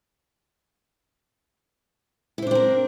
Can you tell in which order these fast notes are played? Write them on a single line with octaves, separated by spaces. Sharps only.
E4 C5 D4 C4 A#4